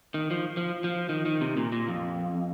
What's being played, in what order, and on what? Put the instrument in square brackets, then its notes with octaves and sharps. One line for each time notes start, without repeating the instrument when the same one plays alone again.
[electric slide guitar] D#3
F3
F3
F3
D#3
D#3
C3
A#2
A#2
F2